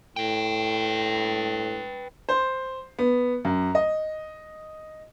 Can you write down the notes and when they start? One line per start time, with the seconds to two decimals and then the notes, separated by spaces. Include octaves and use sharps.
0.16 A2 B4 G5
2.29 C5
2.99 B3
3.45 F#2
3.75 D#5